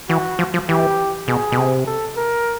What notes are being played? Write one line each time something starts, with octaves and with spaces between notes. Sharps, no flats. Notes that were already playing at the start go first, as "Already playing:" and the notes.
E3 F#4
F3
F3
E3 G4
B2 G#4
B2
C3
A4
A#4